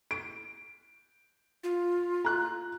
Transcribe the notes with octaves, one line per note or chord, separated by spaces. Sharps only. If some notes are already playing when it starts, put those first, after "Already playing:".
D7
F4
A#5 F#6